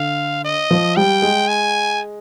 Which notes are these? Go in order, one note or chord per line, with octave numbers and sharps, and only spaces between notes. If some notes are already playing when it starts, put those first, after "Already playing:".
Already playing: D3 F5
D#5
F3
G3 G5
G#3
G#5